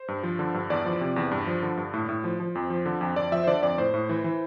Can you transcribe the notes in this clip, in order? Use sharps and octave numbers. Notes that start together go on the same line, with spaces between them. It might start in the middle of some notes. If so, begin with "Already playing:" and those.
Already playing: C5
G2
F3
D3
G2
E2 D5
F3
C3
E2
G2
F3
D3
G2
A2
A2
F3
F3
F2
F3
D3
F2
F2 D5
F3 E5
C5
D3 D5
F2 D5
A2 C5
A2
E3
E3